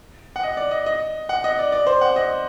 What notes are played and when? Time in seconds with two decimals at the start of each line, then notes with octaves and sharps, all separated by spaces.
0.36 F#5
0.43 D#5
0.57 D5
0.71 D#5
0.86 D#5
1.29 F#5
1.44 D#5
1.59 D5
1.72 D5
1.87 C5
2.01 F#5
2.16 D#5